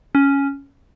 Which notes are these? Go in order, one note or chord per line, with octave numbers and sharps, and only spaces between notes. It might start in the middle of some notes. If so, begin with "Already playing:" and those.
C#4